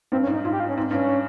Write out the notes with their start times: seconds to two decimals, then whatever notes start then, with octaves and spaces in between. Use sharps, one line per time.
0.12 G2 C4
0.23 C#4
0.27 G#2
0.34 D#4
0.44 G#2 F4
0.53 G4
0.60 F4
0.69 C#4
0.77 G#2 C4
0.91 G2 C#4